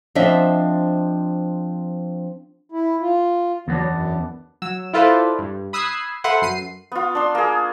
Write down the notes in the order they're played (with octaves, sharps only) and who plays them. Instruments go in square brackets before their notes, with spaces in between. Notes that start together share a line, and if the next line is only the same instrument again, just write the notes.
[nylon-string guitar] F3 C4 D4 D#5 E5
[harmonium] E4
F4
[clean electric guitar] E2 B3 D4 [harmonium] F#3
[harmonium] F#2
[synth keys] F#3 E6
E4 F4 A4 B4 C5 D5
G2
B5 D#6 E6 F#6 G#6 C7
A4 B4 C5 E5 F#5
F#2 C7 D#7
[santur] B3 F4
D4 C6
A#3 G#4